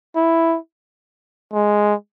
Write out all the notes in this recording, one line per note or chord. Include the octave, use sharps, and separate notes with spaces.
E4
G#3